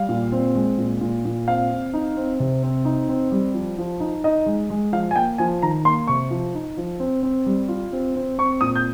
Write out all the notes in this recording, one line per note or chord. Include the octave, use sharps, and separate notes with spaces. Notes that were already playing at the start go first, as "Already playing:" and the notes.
Already playing: G3 F5
A#2
C4
G#3
A#2
A#2
A#2
C4 F5
C4
D#4
C4
C3
C4
D#4
C4
G3
F3
F3
D#4
D#4 D#5
G#3
G#3
F3 F5
G#5
A#3 G5
F3 G#5
D#3 A#5
A#3 C6
C3 C#6
F3
D#4
F3
C4
C4
G3
F4
C4
C4
C4 C#6
A#2 D#6
G6